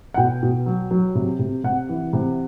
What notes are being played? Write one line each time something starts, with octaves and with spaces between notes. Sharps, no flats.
F#5
B2 G5
B2
F#3
F#3
C3
C3
C3 F#5
E3
C3